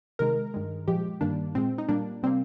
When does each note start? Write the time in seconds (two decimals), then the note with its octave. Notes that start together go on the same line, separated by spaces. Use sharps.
0.19 C3 D#3 G#3 A#4
0.54 G2 D#3 G#3
0.88 A#2 F3 G#3 G4
1.21 G2 D#3 G3 A#3 D4
1.55 A#2 G#3 C4
1.78 D#4
1.88 A#2 G3 A#3 D4
2.23 C3 G3 A#3 C4